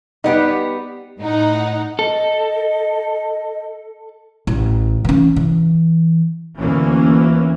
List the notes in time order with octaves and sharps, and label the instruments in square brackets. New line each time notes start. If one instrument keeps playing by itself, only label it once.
[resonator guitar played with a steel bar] G3 B3 G4 [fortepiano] D#4
[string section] A2 D#4 F#5
[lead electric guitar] A4 [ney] D#5
[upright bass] A1
E3 C#4
E3
[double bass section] D2 E3 A#3 C#4